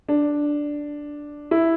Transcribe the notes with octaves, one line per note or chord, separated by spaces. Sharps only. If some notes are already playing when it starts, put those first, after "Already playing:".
D4
E4